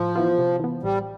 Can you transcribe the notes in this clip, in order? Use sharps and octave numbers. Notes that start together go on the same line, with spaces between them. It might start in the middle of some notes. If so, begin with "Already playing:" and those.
Already playing: A2 F3
E3 B3 F4
C3
E3 B3
A1 G3